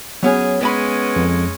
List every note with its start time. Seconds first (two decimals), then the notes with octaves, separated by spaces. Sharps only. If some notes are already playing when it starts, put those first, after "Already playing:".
0.23 F#3 B3 C#4 G#4
0.61 G#3 B3 C#4 D5 B5
1.16 F2